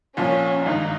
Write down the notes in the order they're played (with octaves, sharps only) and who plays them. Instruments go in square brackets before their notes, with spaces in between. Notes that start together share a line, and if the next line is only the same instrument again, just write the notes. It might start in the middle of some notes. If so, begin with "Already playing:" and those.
[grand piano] C2 A#2 F3 [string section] C#4
[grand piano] G#1 G2 D#3 [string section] D#4